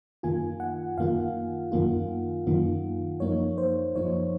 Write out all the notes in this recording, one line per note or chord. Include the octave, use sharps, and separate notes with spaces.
F#2 D#3 A#3 F4 G#5
F#5
F#2 D#3 A#3 F4 F5
F#2 D#3 A#3 F4
F#2 D#3 A#3 F4
F#2 F3 A#3 D#4 C#5
C5
F#2 F3 A#3 D#4 C#5